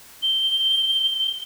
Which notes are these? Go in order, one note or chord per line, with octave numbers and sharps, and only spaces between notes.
G7